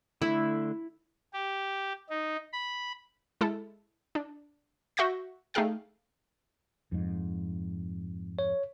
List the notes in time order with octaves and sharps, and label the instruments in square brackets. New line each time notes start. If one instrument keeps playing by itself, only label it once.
[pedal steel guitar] D3 A3 [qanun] E4
[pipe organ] G4
D#4
B5
[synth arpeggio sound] G#3 E4 A4
D4
F#4 E5 C#6 G6 A#6
A3 D#4 G#4 F5 G5
[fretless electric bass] F2 G#2
[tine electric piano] C#5